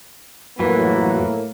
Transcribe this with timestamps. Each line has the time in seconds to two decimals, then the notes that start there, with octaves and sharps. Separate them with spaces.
0.59 F2 A2 E3 F#3 A#3 F#4 B4